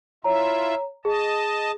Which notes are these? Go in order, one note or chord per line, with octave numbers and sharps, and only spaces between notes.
E4 F4 C#5 E5 A#5
G#4 D#5 A5